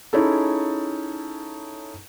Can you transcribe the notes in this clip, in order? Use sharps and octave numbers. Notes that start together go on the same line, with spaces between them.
C#4 D#4 E4 G#4 A4